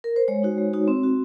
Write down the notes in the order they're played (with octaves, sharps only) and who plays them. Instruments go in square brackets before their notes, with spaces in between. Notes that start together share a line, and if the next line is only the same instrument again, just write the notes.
[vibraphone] A#4
C5
G#3 C#5
D#4 F#4
G#3
D#4 F#4
C4
F#4